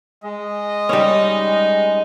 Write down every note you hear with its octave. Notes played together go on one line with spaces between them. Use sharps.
G#3 D#5
G3 C#4 D#4